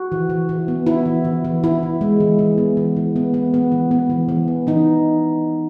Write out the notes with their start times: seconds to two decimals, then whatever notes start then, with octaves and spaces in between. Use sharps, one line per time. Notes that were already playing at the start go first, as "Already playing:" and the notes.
Already playing: F#4
0.12 E3
0.30 E3
0.49 E3
0.68 B3
0.87 B3 E4
1.06 E3
1.25 E3
1.44 E3
1.64 E3 E4
1.83 E3
2.01 G#3
2.20 E3
2.39 E3
2.58 B3
2.77 E3
2.96 E3
3.16 B3
3.34 B3
3.54 B3
3.72 E3
3.91 B3
4.10 E3
4.29 E3
4.48 B3
4.67 E3 D#4